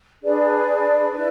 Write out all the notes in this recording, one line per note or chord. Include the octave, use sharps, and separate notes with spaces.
D4 G#4 B4 D5
E4 B4